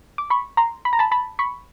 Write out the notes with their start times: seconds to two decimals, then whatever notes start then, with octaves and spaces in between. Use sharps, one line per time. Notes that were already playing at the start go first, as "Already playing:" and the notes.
0.18 D6
0.30 B5 C#6
0.57 A#5 C6
0.85 B5
0.93 A#5
0.99 A5 B5
1.11 A5 B5
1.39 B5 C#6